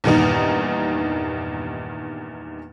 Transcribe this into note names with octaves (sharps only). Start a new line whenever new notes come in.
E2 G2 A#2 D#3 D#4